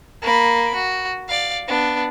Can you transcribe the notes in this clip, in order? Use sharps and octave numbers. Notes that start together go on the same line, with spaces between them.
A#3 B5
F#4
D5 F5
B3 D4